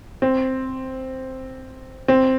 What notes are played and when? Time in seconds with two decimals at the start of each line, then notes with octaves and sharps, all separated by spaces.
0.22 C4
2.08 C4